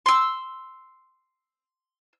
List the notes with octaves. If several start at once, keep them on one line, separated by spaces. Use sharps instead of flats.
C6 E6